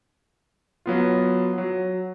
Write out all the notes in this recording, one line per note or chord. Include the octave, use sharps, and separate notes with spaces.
F#3 B3 F4
F#3